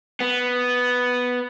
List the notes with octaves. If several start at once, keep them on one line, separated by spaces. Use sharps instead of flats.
B3